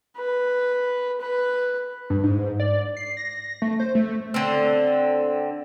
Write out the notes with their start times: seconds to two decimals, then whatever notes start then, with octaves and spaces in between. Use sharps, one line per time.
0.17 B4
1.21 B4
2.10 G2
2.23 G#2
2.60 D5
2.97 C7
3.17 A#6
3.62 A3
3.80 C5
3.95 A3
4.34 D3 C4